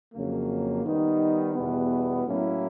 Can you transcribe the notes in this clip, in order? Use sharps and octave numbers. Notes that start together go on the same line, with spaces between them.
F2 C#3 F#3 A#3
D#3 G3 B3 D#4
E2 B2 G3 B3
A2 F#3 A#3 C#4 E4